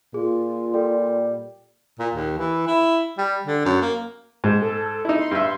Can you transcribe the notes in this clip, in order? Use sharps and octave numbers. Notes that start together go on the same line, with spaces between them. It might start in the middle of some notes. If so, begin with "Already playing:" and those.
A#2 F4 G#4
G3 A4
A#2
D#2
E3
E4
G3
D3
F#2
A#3
G#2 G#3
A4
D#4 E4
C6
G2 E5